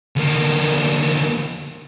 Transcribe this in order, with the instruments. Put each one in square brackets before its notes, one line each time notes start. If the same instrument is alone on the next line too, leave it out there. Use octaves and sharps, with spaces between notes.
[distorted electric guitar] D2 A#3